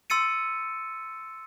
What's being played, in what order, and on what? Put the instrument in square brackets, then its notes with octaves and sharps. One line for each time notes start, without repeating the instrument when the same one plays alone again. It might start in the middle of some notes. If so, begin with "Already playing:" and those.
[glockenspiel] C6 E6 A6 C#7 D#7